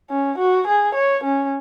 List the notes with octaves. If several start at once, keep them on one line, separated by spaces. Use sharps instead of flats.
C#4
F#4
G#4
C#5
C#4